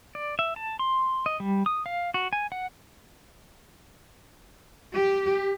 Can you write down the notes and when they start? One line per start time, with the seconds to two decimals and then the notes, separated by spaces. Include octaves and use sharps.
0.15 D5
0.39 E5
0.56 A5
0.79 C6
1.26 D#5
1.40 G3
1.66 D#6
1.86 F5
2.14 F#4
2.33 G#5
2.52 F#5
4.93 G4